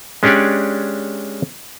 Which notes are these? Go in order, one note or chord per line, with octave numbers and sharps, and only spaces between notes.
G#3 C#4 D4 G4 C#5 D5